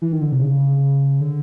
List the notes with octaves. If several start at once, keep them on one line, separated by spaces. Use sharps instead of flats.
E3
D#3
D3
C3
C#3
D3